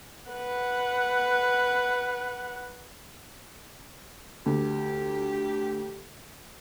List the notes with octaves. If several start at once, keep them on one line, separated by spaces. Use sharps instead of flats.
B4 F#5
D2 G4